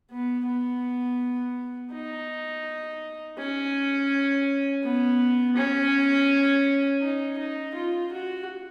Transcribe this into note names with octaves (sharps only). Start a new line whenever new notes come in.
B3
B3
D#4
C#4
B3
C#4
D#4
D#4
F4
F#4